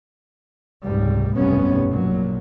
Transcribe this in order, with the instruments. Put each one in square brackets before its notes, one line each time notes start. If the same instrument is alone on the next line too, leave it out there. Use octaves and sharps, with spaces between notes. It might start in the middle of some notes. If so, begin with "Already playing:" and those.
[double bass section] F1 C#2 G#2 G3
F1 B1 G2 B3 C#4
A#1 A#2 F#3